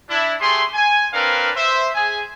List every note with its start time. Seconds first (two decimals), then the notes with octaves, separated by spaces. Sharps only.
0.10 D4 E4
0.41 A3 G4 G#4 C6
0.74 G#5
1.13 C4 D4 A#4 B4 F5
1.55 C5 E5
1.95 G#4 G#5